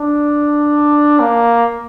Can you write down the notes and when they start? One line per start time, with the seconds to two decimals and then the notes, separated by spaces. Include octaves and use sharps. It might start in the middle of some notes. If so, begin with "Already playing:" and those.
Already playing: D4
1.20 A#3